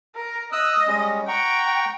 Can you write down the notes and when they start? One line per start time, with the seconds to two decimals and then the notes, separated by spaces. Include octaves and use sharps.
0.15 A#4
0.52 D#5 D#6 E6 F#6
0.87 G3 G#3 C#4
1.28 F#5 G5 A#5 C#6